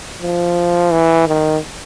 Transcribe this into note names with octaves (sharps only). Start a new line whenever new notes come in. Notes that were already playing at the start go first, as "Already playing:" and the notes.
F3
E3
D#3